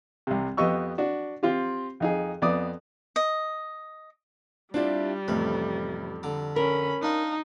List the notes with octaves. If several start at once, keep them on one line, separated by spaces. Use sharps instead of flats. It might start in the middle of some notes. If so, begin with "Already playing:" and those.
C2 C3
F2 B3 G4 D#5 C#6 E6
D4 F#4
C4 F4 G4
F2 D#4 G#4
F2 B3 D5 D6 D#6
D#5
G3 C4 D4 E4 F4 G4 D5 D6
A1 F2 C3 A3 B4
D3 A#5 D6
C#4 A#4 B5
D4 D#4 F4 D5